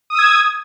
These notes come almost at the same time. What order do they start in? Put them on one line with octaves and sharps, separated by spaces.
D#6 E6 G#6